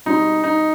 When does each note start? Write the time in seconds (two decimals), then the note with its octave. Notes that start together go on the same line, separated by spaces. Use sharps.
0.06 B2 G3 C4 D#4
0.44 D#4